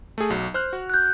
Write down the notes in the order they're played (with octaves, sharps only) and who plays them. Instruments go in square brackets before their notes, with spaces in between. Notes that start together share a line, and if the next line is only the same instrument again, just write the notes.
[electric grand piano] A3 G#4
B1 F#3
C5 F6 F#6
F#4
[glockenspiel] F#6 G6